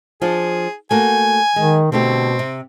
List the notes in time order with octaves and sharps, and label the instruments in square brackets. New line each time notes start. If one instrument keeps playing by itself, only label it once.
[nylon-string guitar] F3 D4 F4 [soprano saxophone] G#4
[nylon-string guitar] A3 A#3 F#4 [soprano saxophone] G#5
[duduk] D#3 [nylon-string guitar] G#3
[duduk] B2 [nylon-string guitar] D3 A3 G4 [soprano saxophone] C4
[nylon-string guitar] C3